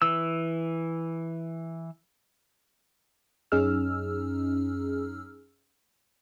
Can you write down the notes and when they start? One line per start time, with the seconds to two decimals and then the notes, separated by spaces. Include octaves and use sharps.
0.02 E3 E6
3.52 F#2 C#4 D#4 G#4 E6 F6